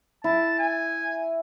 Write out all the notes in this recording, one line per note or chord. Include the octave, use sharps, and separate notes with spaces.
E4 A5
G#5